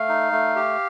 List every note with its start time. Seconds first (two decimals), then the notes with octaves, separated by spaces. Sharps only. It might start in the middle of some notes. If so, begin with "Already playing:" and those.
Already playing: A3 F5
0.09 D#4
0.32 A3
0.56 G4